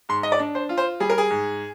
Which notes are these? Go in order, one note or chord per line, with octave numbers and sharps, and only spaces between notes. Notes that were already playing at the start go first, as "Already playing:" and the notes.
G#2 C6
D#5
D5
D4
C5
F4
C5
G3 G#4
A#4
G#4
G#2